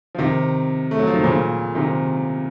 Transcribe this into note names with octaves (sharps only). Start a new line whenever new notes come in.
F3
C3 D#3
A3
F#3
F3
D#3
A#2 C#3
C3 D#3